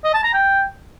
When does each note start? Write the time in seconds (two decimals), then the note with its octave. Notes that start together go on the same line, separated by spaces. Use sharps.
0.04 D#5
0.14 A5
0.24 A#5
0.33 G5